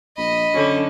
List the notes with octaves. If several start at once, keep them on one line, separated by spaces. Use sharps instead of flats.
A#1 D#5 B5
F#2 D3 C#4